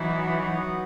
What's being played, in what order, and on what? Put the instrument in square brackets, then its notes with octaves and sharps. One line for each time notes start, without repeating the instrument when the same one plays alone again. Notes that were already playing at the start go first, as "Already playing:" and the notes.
Already playing: [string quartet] E3 [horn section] F#3 B3 D#4 F#4